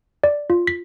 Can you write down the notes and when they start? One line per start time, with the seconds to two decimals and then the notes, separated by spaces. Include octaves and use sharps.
0.24 D5
0.50 F4
0.67 B6